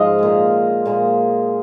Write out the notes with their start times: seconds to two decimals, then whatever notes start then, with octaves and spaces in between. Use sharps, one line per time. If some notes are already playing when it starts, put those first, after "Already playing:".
Already playing: G#2 F3 D#5 F5 G#5
0.19 A#2 G#3
0.85 A#2 G#3